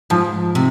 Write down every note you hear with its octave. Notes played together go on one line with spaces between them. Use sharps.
G#2 F3
C3